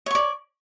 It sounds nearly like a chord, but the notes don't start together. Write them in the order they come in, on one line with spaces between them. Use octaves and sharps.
C#5 C#6 D5